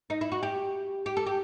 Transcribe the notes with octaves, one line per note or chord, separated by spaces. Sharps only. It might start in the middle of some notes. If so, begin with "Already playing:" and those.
D#4
E4
F#4
G4
G4
A4
G4